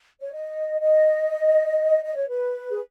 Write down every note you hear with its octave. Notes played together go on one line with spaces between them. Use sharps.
C#5
D#5
D#5
D#5
C#5
B4
G#4